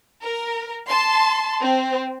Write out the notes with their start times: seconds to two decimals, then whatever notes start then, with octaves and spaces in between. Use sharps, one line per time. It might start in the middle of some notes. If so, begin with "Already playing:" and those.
0.22 A#4
0.87 A5 C6
1.62 C4